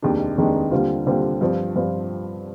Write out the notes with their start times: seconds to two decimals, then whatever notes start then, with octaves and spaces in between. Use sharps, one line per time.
0.02 F1 D#2 D#3 G#3 D4
0.37 F1 D#2 D#3 G#3 D4
0.71 D#2 D3 G3 C4 F4
1.06 D#2 D3 G3 C4 F4
1.41 G2 F3 C4 F4
1.76 G2 F3 C4 F4